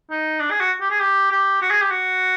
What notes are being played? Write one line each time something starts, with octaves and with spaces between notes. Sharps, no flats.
D#4
D4
G#4
F#4
G4
G#4
G4
G4
F#4
G#4
G4
F#4